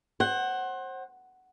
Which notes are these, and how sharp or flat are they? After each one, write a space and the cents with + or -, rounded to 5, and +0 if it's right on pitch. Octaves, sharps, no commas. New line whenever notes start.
C5 +30 F#5 +15